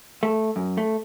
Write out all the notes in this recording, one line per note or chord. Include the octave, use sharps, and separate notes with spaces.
A3
F#2
A3